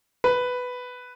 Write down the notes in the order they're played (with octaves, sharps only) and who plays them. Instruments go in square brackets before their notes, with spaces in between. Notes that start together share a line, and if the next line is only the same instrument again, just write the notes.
[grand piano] B4